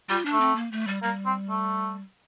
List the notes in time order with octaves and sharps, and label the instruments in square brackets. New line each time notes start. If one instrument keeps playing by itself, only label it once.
[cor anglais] G3 [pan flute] F4
[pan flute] D4
[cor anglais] A3
[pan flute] C4
A#3
A3
G3
[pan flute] G3 [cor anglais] A#3
[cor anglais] C4
A3